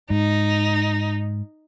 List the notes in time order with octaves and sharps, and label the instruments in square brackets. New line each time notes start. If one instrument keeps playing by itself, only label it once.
[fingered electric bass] G#2 [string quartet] D#4